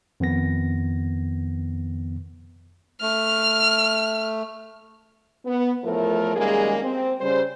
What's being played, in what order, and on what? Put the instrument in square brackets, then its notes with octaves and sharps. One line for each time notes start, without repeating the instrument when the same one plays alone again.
[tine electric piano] F2 D#3 B3 A#6
[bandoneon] A3 [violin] F6
[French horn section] B3
E2 A2 F3 A3 A#4
F#2 D#3 G3 G#3 A#3 G#4
C4
C#3 G3 C5